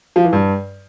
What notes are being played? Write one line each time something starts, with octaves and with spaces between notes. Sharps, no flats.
F3
E3
G2